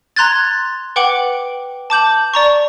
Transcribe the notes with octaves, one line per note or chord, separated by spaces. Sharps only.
A#5 C6 F#6 G#6 A6
B4 F#5 G5 D6 F#7
A5 D6 G6 F#7
D5 A#5 C#6